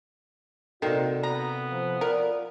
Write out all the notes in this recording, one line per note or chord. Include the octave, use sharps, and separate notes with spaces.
C3 D#3 A#3 F#4 A4 D5
B3 A#5
F3
F4 A#4 D5